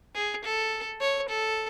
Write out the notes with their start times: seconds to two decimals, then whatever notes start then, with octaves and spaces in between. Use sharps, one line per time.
0.15 G#4
0.44 A4
1.01 C#5
1.29 A4